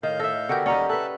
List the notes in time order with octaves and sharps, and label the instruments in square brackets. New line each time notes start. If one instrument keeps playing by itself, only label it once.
[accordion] A2 F5 G6 [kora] D#3
[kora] A4 E5 [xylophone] D#5
[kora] D3 F#4 A#4 [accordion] B3 G4 [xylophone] F#5 G5 G6
[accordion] D#2 G3 D#5 [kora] C#4 G4 [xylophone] D5 F#5 A#5
[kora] A4 B4 [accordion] E5 A5 F#6